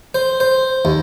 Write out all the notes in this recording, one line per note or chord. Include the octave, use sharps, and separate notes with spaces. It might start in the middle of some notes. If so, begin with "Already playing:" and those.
C5
C5
D#2